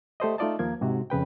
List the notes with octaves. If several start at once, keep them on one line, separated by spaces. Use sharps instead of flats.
A3 G4 A4 C5 D5 D#5
A3 D#4 F4 D5 D#5 A5
D#2 F3 A#3 G#6
G#2 C3 F#4
F2 C#3 B4 G5